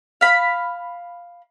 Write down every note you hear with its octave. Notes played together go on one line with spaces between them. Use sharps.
F5 B5